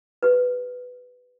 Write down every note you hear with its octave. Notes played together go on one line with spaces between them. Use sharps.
G4 B4